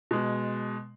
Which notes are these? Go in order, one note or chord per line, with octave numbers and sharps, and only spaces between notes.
B2 G#3